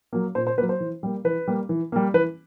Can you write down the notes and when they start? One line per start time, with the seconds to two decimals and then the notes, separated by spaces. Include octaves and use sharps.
0.13 F#3 A#3
0.35 A#2 C5
0.47 C5
0.58 A#3 B4
0.62 F#3
0.69 C5
0.80 E3
1.03 G3 A#3
1.24 E3 B4
1.47 G3 A#3
1.69 E3
1.92 G3 A#3
2.14 E3 B4